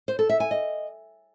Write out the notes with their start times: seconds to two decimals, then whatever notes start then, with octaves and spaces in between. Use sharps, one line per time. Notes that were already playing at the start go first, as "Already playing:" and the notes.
0.08 C5
0.19 A4
0.29 E5
0.40 G#5
0.51 D#5